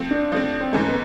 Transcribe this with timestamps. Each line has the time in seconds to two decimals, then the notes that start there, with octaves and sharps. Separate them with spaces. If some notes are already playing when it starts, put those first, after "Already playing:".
Already playing: F3 A3 C4
0.11 D4
0.32 F3 A3 C4
0.61 C4
0.73 G#2 E3 A3 C#4
0.88 B3